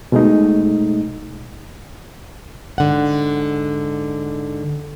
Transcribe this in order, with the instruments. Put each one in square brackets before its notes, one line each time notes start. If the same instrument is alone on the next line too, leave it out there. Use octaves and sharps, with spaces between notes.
[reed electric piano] B2 G#3 A3 D#4
[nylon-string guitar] G#2 D3 F#5